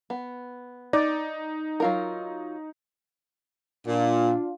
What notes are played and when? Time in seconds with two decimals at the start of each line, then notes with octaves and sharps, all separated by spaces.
0.10 B3
0.93 D#4 D5
1.80 F#3 F4 A#4
3.86 A#2 D4 F4